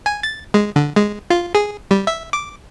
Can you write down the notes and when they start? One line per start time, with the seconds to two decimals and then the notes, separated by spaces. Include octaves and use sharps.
0.06 G#5
0.23 A6
0.54 G#3
0.76 D3
0.96 G#3
1.30 F4
1.55 G#4
1.91 G3
2.07 E5
2.33 D6